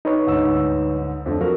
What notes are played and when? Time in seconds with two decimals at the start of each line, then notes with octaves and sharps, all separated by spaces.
0.05 D#4 B4 C#5
0.27 D2 G#2 E6
1.26 F2 A3 D4
1.41 F3 F#4 A#4